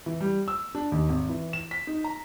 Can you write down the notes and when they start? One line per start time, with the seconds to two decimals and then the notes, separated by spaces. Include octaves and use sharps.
0.06 E3
0.21 G3
0.48 E6
0.75 D4
0.92 D#2
1.09 G#1
1.29 E3
1.53 E7
1.71 B6
1.87 D#4
2.04 A#5